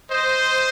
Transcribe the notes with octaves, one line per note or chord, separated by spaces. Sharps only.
C5 D#5